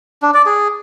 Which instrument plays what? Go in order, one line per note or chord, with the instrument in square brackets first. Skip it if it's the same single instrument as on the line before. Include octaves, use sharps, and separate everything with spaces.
[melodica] D4
D5
G#4